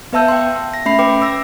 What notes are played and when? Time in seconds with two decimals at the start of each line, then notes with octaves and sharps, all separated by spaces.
0.13 B3 B4 E5 A5 E6 G6
0.28 G5 C6
0.74 A#6
0.85 A3 C#4 E5 B5 C7
0.99 B4 G5 D6
1.21 D6 E6 A#6